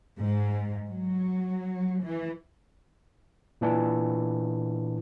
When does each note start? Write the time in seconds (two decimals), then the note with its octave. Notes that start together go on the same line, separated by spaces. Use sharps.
0.18 G#2
0.86 F#3
2.01 E3
3.61 A#2 E3 D4